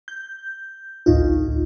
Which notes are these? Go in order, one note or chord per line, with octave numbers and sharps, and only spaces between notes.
G6
A1 D2 A2 D#4 F4